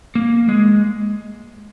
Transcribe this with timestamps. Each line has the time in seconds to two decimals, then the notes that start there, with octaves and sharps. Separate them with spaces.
0.15 A#3
0.49 G#3